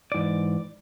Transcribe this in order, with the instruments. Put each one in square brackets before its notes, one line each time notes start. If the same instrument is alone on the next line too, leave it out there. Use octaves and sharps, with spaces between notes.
[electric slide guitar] G#2 E3 D5